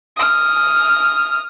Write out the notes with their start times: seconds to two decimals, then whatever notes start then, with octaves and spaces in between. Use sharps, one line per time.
0.17 D#6 F6